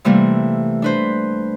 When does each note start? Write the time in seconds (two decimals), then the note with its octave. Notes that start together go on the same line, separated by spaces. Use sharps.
0.05 C3 E3 G3 A3 A#3
0.82 D4 B4 C5